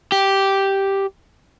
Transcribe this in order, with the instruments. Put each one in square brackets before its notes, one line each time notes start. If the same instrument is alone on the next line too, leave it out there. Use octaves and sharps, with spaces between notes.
[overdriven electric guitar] G4